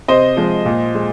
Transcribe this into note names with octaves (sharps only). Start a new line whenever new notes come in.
C3 C5 D#5
F3 G#3
A#2
G#3